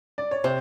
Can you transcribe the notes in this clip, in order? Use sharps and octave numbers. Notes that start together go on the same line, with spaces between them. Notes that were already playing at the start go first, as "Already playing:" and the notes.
D5
C#5
C3 C5